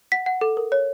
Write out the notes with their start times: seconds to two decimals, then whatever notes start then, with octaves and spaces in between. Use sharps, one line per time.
0.12 F#5 B6
0.26 F#5
0.41 A4
0.57 A#4
0.72 C#5